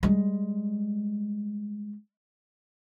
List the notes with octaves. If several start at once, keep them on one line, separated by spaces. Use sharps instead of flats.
G3 G#3